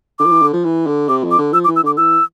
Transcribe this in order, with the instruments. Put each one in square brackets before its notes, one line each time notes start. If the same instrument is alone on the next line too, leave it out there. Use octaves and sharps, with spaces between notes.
[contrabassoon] D3 [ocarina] D6
[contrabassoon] F3
E3
D3
F3
E3
D3
[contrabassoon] C3 [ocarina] D6
[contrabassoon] F2
[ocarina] D6
[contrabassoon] D3
[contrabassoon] F3 [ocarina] E6
[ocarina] D6
[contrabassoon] E3
[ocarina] E6
[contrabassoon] D3 [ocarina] D6
[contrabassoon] E3 [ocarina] E6